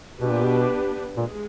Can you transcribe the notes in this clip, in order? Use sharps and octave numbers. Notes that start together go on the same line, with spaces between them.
B2 B3 D4 G4 B4
A#2
B2
A#2 G#3